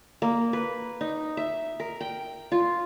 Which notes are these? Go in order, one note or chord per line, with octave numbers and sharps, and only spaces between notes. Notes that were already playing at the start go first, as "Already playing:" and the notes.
A#3
B4
D#4
E5
A#4
G5
F4